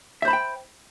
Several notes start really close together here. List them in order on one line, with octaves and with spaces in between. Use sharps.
E5 C5 B5 A5 G5